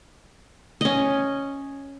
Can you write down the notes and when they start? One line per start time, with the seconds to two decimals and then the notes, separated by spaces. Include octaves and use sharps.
0.81 C#4 D#5